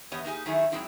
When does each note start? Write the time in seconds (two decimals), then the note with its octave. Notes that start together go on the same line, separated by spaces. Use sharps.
0.12 E2 B3 G4 C#5 D#5
0.24 A#3 D#4 G4 G#4
0.46 D#3 F#3 A3 E4 G#4
0.72 G#2 F3 F#3 C4 E4 G#4